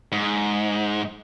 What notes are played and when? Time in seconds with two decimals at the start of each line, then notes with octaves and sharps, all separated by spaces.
0.12 G#2